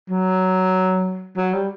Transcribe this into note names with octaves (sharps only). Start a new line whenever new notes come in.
F#3
F#3
G3